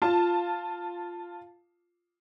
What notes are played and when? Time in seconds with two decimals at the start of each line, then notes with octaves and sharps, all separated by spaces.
0.02 F4 A5